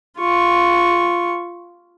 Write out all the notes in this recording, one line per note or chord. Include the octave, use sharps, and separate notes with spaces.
F4 C#6